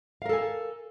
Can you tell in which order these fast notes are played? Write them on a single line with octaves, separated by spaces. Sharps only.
F5 A#4 A4 G#5